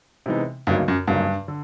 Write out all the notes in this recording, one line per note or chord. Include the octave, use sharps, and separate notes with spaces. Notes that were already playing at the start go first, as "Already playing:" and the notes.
C3 E3 G#3 B3 D#4
D2 G2 C#3 F#3 A#3 D#4
F#2
D2 G2 C#3 F#3 A#3 D#4
D3